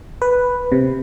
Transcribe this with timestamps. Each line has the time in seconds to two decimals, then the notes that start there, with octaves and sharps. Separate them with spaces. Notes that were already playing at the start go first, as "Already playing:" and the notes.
0.22 B4
0.72 C3